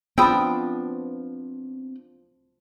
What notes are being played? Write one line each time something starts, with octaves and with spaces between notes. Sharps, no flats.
F3 B3 C4 D4 G5 B5 D#6 E6